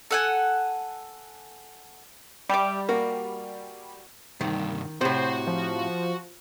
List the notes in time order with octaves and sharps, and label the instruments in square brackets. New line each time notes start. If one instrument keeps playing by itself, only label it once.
[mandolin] A4 F#5 G#5
[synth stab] G3 [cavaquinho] G4 E5 D6
[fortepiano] A#3 [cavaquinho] F#4
[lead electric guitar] C2 G2 [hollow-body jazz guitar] D#3
[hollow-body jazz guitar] A2 C3 [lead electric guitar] F#4 F#5 [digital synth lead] C5
[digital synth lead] F3